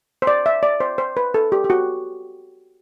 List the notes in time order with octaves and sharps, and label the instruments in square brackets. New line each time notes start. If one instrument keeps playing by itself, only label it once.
[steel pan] C5
D5
E5
D5
C5
C5
B4
A4
G4
G4
F#4